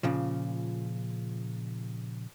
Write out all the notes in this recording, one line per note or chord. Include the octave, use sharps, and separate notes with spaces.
A#2 C#3 F3